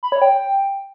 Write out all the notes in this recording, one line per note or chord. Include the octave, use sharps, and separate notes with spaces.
B5
C#5
G5